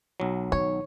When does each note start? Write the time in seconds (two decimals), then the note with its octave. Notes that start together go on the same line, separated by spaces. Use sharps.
0.20 B1 F#3
0.52 D#3 C#5